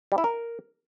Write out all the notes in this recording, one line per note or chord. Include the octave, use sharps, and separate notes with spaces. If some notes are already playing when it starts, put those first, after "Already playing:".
G3
E4
A#4